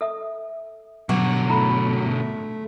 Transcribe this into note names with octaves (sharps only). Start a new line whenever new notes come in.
A4 E5 D#6
B2 D3 F#3 F#4 F#5 D6
A3 E4 A#5 B5